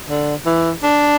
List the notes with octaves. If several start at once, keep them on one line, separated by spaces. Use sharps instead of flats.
D3
E3
D4